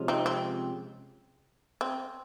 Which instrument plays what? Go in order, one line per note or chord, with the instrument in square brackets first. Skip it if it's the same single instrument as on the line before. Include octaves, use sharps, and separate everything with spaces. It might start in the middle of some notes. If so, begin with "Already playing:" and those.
Already playing: [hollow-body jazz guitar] C3 F3 G#3 C#4 F4
[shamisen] C4 D#4
C4
C4